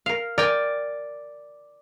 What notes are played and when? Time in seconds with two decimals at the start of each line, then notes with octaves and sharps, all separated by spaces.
0.06 A#4 F5
0.38 A#4 D5 G5 G#5